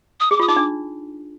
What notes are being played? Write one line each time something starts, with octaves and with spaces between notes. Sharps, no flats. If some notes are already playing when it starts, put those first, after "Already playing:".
D#6
G#4 D6
F4 D#6
D#4 D6
D4